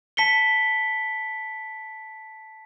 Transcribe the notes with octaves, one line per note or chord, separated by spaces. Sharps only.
A5 B6 C#7 G7